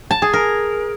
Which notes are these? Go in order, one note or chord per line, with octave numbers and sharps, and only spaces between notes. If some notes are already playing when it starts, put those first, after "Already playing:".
A5
G#4
A#4